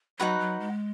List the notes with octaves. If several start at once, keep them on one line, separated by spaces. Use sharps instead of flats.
F#3 D#4 F#4 B4 F#5
F#3
G#3